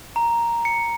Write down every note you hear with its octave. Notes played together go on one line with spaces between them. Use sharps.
A#5
C#7